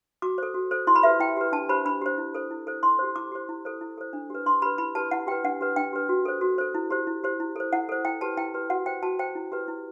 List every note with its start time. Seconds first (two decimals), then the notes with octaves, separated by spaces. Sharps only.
0.22 F#4 D6
0.38 A4 C5
0.54 F#4
0.71 A4 C5
0.87 E4 C6
0.96 B5
1.03 G4 B4 E5
1.20 E4 G5
1.37 G4 B4
1.52 D4 A5
1.69 G4 C5 B5
1.85 D4 B5
2.02 G4 C5
2.18 E4
2.34 A4 C5
2.51 E4
2.67 A4 C5
2.83 E4 C6
2.99 G4 C5
3.16 E4 D6
3.32 G4 C5
3.49 E4
3.65 A4 C5
3.81 E4
3.98 A4 C5
4.13 D4
4.30 G4 B4
4.46 D4 C6
4.62 G4 B4 B5
4.78 E4 B5
4.95 G4 B4 A5
5.11 E4 F#5
5.27 G4 B4 G5
5.44 D4 F#5
5.61 G4 B4
5.76 D4 G5
5.93 G4 B4
6.09 F#4
6.25 A4 C5
6.41 F#4
6.58 A4 C5
6.75 E4
6.90 G4 C5
7.07 E4
7.24 G4 C5
7.40 E4
7.56 A4 C5
7.73 E4 F#5
7.89 A4 C5
8.05 E4 G5
8.21 G4 B4 A5
8.37 E4 G5
8.54 G4 B4
8.70 F#4 F#5
8.86 C5 G5
9.03 F#4 A5
9.19 C5 G5
9.35 E4
9.52 G4 B4
9.68 E4